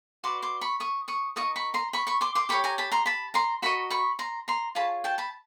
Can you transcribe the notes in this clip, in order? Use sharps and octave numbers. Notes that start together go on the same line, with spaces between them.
F#4 B4 D5 C6 D6
C6 D6
B5 C#6
C#6 D#6
C#6 D#6
D#4 F#4 A#4 C#6 D#6
B5 C#6
A#5 C6
B5 C#6
B5 C#6
C6 D6
C6 D6
G4 A#4 C#5 B5 C#6
G#5 A#5
A5 B5
A#5 C6
A5 B5
A#5 C6
F#4 A#4 D#5 B5 C#6
B5 C#6
A#5 C6
A#5 C6
F4 G#4 C#5 A5 B5
G5 A5
A5 B5